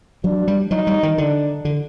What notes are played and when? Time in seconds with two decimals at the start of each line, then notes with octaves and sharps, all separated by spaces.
0.24 F#3 D4
0.48 G3
0.71 F#3 D#4
0.87 G3
1.03 D#3
1.18 D3 D4
1.65 D3